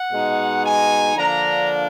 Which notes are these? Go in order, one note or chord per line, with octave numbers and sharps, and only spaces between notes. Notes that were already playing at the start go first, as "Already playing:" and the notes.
Already playing: F#5
B2 G#3 D#4
G#5
D3 F3 A#3 D4 A#5